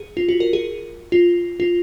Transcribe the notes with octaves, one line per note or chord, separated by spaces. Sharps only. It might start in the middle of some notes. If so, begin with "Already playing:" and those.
Already playing: G#4
F4
F#4
A#4
G#4
F4
F4